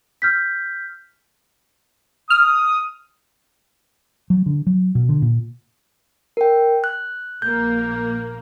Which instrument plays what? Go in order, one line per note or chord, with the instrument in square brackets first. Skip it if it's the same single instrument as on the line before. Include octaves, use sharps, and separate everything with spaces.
[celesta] F6 G6 B6
[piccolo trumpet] D#6 [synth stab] F6
[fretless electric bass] F#3
D3
F#3
B2
D3
A#2
[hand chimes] A#4 G5
F#6
[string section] A#1 A#3 [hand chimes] G6